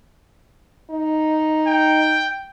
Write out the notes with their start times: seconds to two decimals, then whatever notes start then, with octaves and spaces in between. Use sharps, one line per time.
0.90 D#4
1.67 G5